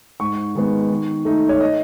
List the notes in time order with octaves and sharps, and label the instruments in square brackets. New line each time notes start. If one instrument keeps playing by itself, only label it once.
[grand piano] G#2 C#6
D#3 G#3 B3
D#3
A3 D#4
C#5
D#5